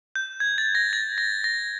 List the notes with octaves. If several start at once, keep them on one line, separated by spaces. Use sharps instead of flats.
G6
G#6
A6
A#6
A6
A#6
A#6